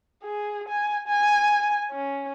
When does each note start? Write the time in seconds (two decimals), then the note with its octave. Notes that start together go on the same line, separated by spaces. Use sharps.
0.23 G#4
0.68 G#5
1.07 G#5
1.92 C#4